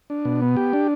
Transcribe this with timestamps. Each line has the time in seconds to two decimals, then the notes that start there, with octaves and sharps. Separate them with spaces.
0.10 D4
0.25 B2
0.42 B3
0.57 G4
0.73 D4